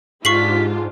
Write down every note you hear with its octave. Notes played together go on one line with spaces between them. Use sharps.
G#2 D4 F4 G4 C#6 B6 C7 F#7